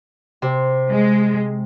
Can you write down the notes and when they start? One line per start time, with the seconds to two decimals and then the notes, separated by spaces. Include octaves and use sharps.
0.42 C3
0.90 G#3